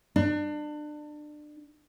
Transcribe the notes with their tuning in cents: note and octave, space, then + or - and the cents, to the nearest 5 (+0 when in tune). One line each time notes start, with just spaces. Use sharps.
D4 +30